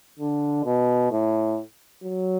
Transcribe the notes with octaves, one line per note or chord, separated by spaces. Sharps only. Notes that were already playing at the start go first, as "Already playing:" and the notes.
D3
B2
A2
F#3